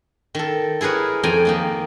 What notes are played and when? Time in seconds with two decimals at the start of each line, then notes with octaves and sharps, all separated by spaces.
0.35 D#3 A4
0.81 E4 G#4 A#4 B4 C#5
1.23 F2 G5 G#5 A#5
1.45 D#3 A#3 D#4